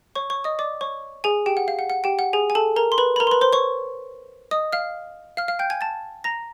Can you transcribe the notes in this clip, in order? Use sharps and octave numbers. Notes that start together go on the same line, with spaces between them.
C#5 C#6
C#5 C#6
D#5 D#6
D5 D6
C#5 C#6
G#4 G#5
G4 G5
F#5
F5
F#5
F#5
G4 G5
F#5
G#4 G#5
G#5
A4 A5
A#4 A#5
C6
B4 B5
B5
A#4 A#5
C6
B4 B5
C5 C6
C#5 C#6
D#5 D#6
F5 F6
F5 F6
F5 F6
G5 G6
G#5 G#6
A5 A6
A#5 A#6